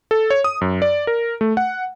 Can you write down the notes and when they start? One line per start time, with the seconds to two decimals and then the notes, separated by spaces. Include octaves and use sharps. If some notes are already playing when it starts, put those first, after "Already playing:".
0.11 A4
0.30 C#5
0.44 D#6
0.61 F#2
0.82 D5
1.07 A#4
1.41 A3
1.57 F#5